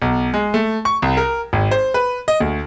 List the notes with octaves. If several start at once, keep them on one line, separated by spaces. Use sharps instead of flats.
B1
G#3
A3
C#6
C2
A#4
G#1
C5
B4
D#5
D2